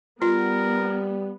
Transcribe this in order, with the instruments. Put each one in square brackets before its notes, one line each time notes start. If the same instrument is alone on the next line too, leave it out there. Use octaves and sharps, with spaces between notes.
[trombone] G3 [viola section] B3 [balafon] F4 [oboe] A#4